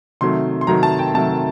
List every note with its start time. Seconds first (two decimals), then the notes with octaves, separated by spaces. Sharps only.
0.21 C3 D#3 F#3 A3 C6
0.61 C6
0.67 C3 D#3 F#3 A3 A#5
0.83 A5
0.99 G5
1.14 C3 D#3 F#3 A3 A5